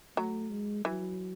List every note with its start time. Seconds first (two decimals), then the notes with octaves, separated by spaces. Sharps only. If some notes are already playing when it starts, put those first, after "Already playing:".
0.17 F#3 A3
0.51 G#3
0.85 E3 F#3